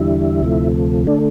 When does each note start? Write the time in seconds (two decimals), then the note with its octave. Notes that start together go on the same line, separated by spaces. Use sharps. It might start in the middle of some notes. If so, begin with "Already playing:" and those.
Already playing: E2 D3 G3 E4
0.41 D2 C3 F3 A3
1.07 D3 A3 D4